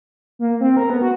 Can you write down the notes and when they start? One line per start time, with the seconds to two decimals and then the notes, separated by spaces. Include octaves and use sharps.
0.39 A#3
0.61 C4
0.77 A#4
0.90 B3
1.02 F#4